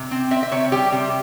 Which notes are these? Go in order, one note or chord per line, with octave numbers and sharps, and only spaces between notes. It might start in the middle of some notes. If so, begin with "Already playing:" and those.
Already playing: C3
C4
C4 E5
E5
C3 C#5
G3 G4
C3